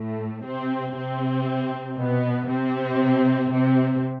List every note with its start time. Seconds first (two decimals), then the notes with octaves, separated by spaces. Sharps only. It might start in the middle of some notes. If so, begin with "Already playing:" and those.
Already playing: A2 A3
0.45 C3 C4
0.96 C3 C4
1.98 B2 B3
2.50 C3 C4
3.53 C3 C4